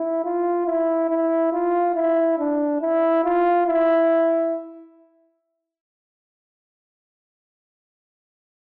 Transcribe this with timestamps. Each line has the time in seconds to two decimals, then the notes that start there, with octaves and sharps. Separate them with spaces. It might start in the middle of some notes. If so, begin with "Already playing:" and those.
Already playing: E4
0.24 F4
0.66 E4
1.10 E4
1.52 F4
1.95 E4
2.38 D4
2.81 E4
3.24 F4
3.67 E4